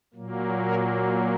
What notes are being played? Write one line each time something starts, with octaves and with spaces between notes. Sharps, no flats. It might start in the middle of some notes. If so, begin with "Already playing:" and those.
A#2 F#3 A#3
F#4 A#4